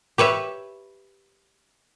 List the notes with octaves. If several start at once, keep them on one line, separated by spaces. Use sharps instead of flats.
G4 B4 C#5 E5